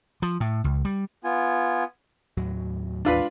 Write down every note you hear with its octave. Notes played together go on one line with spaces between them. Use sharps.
F3
A2
C#2
G3
B3 F4 G#5
D#2 A2 F#3
D1 A1 D#2 D4 F4 B4